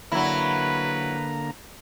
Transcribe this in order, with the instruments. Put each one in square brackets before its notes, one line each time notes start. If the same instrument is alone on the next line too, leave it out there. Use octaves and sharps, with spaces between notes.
[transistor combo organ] D3 A#3 A#5 [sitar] F#3 E4 [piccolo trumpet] B4